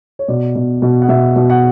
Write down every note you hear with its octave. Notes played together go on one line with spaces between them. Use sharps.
C#5
B2 D5
B2
B2
F#5
B2 E5
B2
F#5